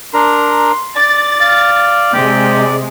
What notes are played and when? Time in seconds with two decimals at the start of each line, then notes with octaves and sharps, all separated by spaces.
0.14 D4 A#4 A#5 C6
0.96 D5 A6
1.41 F5
2.13 C3 G#3 G4